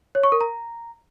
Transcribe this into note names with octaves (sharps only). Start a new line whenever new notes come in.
C#5
C#6
A#4
A#5